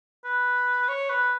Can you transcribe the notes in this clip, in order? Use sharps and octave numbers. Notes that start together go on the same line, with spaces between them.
B4
C#5
B4